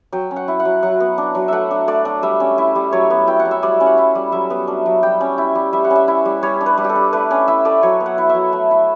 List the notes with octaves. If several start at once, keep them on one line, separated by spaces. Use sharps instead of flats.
F#3 G5
C#4
F#5
E4
F#5
F#3
F#3 F#5
B3
D4
F#3
A3 E5 F#5
D4
A3 D5
D4
G3 E5
C#4
E4
G3
F#3 C#5
B3
E4 G5
F#5
F#3
E5
G3 D5
C#4
F#5
E4
G3
F#3 E5
B3
D4
F#3
G3 G5
C#4
E4
G3
G3 E5
F#5
C#4
E5
E4
G3
G3 C#5
D4
B4
G3
G4 A4
D4
A3 B4
C#4 D5
E4 E5
A3 D5
F#3 C#5
B3
F#5
E4
E5
F#3
A3
E4